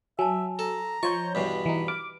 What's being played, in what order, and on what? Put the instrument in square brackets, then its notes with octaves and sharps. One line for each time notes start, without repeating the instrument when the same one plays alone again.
[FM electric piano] F#3 [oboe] E5 [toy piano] G#5 A5
[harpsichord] A4 [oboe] A#5
[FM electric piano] F3 C#5 G6 [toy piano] D#5 C6 [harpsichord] C#6
[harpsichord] E2 G2 B2 [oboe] B5
[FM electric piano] E3 D#4
[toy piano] B4 [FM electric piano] D6